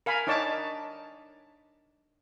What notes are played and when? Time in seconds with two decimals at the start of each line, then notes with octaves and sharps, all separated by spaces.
0.06 A#4 F5 G#5 B5
0.27 D4 D#4 C#5 A5 D6